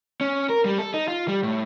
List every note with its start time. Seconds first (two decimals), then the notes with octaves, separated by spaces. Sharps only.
0.21 C#4
0.50 A#4
0.65 G3
0.78 A4
0.94 D#4
1.08 F4
1.28 G3
1.43 A2